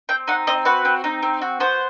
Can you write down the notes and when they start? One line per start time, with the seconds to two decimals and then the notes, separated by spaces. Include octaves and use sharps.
0.09 C4 G5
0.28 D#4 F#5
0.47 C4 D#5
0.65 F#4 B4
0.85 C4
1.04 D#4
1.23 C4
1.42 F#4
1.60 B3 C5